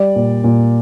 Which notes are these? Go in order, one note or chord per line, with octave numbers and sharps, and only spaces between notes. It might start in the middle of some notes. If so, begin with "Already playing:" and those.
Already playing: G3 D5
A#2
A#2